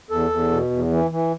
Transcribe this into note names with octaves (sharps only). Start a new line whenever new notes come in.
E2 A4
E2
B2
E2
E3
E3